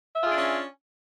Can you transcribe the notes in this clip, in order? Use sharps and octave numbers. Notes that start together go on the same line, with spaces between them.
C#4 D4 F4 G#4 E5